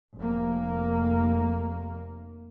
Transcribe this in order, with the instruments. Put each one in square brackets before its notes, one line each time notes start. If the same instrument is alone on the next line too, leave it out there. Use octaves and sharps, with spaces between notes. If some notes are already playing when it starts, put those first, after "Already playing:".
[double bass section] F1 A#3